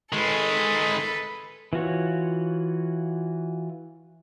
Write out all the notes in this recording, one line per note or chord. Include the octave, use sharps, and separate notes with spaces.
D#3 G#3 A4 B4
E3 F4 F#4 C#5